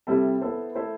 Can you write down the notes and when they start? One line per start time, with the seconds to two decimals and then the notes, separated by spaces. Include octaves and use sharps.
0.07 C3 G3 C4 E4 A4
0.41 B3 E4 A4 C5
0.75 A3 E4 A4 C5